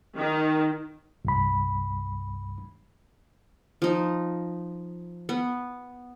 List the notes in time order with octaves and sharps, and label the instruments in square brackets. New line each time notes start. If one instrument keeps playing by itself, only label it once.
[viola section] D#3
[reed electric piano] C2 G2 B5
[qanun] F3 D#4
B3